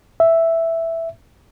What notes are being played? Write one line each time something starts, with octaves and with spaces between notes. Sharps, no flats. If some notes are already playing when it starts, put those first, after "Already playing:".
E5